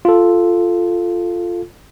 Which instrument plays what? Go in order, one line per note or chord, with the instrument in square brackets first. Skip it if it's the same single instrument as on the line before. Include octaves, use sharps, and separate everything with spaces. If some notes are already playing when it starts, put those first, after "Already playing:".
[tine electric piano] F4 A4